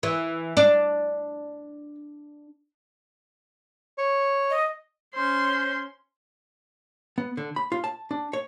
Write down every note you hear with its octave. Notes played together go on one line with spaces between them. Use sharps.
E3
D4
C#5
D#5
C#4 C5 C6
B3
D3
B5
F4
A5
D4
C#5